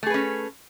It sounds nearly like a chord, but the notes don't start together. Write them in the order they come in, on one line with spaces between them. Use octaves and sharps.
A3 G#4 B4 C#4